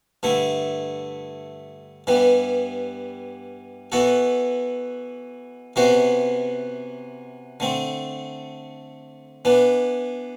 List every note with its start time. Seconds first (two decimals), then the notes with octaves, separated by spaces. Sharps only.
0.23 G2 D3 A3 E4
2.07 G2 E3 G3 B3
3.92 E3 B3 F#4 A4
5.76 C3 E3 B3 F#4 C5
7.60 D3 A3 C4
9.45 E3 B3 D4